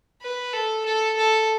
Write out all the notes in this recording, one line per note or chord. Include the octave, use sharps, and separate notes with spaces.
B4
A4
A4
A4